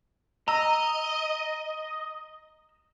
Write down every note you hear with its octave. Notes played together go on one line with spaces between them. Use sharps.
D#5 A#5 E6